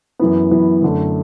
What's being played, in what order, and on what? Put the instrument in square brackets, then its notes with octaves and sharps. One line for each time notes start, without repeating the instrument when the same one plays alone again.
[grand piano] F#2 E3 B3
F#2 E3 B3
F#2 D3 A3